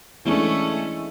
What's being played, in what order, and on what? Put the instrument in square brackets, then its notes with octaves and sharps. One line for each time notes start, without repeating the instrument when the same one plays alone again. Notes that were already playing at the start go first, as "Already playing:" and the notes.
[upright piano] E3 G#3 D4 [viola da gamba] A3 C#4